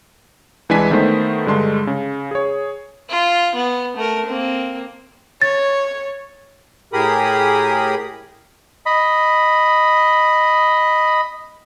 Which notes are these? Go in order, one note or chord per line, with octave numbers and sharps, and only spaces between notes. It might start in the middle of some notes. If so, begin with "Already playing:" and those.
C2 E3 G#3 D4 G#5 B6
D#3 A3 B3 C5
G2 D3 G#3 C6
C#3
G#4 C#5
F4
B3
A3 A#4
A#3 C4
C#5 A6
A2 G4 G#4 A#4 B5 D#6
D#5 B5